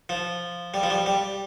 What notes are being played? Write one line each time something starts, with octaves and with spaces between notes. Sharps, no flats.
F3
G3
F3
G3
G3